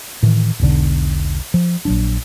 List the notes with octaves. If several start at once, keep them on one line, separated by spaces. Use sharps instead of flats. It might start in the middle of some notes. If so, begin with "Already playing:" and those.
A2 D#3 E3
E1 B1 D3
F3
A#1 F#3 D4